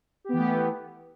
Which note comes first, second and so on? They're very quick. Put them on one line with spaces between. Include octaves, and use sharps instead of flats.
G4 B3 E3 A3